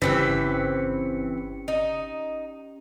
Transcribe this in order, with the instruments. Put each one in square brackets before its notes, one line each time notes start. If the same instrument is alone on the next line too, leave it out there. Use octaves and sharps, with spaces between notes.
[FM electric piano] G1 C#3 C#7 [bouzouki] E3 C4 B4 [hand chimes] C#4 G4
[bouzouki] D#4